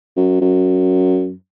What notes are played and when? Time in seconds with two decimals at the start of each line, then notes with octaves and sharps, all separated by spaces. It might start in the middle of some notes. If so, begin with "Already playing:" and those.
0.16 F#2
0.41 F#2